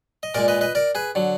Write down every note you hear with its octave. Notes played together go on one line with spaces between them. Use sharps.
D#5
A#2 G#3 A#4 D5
B4 D#5
B4 D#5
A#4 D5
G#4 B4
D3 F#3